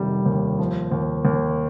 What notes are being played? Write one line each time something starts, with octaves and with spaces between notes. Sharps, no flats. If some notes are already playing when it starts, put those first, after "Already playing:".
Already playing: F1 D#3 G3
D#2
F3
D#2
D#2